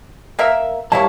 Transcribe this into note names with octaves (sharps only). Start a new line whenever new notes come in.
A#3 A#4 E5
G3 A#3 E4 C#5 A5